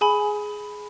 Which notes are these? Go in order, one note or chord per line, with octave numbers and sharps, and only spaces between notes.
G#4 G#5 B5